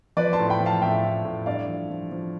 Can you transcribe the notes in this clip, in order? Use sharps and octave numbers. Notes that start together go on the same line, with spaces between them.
F3 B4 D5
A5 C6
A2
G5 B5
F3
F5 A5
A2 E5 G5
A2
A2
G2 D5 F5
F3
F3
F3